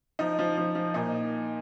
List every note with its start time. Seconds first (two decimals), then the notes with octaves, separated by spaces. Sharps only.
0.19 F3 D#4
0.39 F3
0.57 F3
0.75 F3
0.94 A#2 D#4